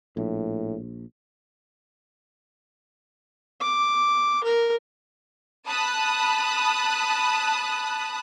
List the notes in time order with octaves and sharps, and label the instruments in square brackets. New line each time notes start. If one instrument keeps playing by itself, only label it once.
[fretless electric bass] A#1 [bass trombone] A2
[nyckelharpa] D6
A#4
[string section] A5 B5 D#6 F#6